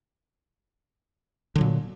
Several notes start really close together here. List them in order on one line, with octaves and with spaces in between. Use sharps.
D3 F#3 A#2